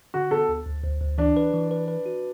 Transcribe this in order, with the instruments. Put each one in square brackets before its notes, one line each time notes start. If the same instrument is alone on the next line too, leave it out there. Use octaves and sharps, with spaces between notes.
[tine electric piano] D3 [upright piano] F#4
[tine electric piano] B3 [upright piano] A4
[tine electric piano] D2
D2
D2
D2
[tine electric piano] E3 [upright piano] D4
[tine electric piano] B4
E3
B4
B4
F#4